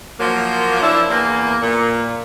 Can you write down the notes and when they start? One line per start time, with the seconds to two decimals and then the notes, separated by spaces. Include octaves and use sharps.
0.19 F3 F#3 A#3
0.82 F3 D4 E4
1.08 E2 A#3
1.61 A#2